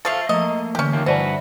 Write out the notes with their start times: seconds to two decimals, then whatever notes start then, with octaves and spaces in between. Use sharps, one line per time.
0.05 F3 A3 A4 E5 F5
0.29 F3 A3 A#3 D#5
0.75 D3 E3 C#4 G4
0.93 D#3 F3 A#3 E5
1.06 G2 E3 F#4 B4 C5 D5 A5